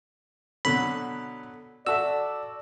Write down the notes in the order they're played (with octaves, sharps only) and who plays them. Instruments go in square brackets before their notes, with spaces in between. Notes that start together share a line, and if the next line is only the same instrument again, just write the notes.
[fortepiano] B2 D3 F#3 [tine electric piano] B5
[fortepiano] F#4 A4 E5 [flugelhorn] D5 [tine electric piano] E6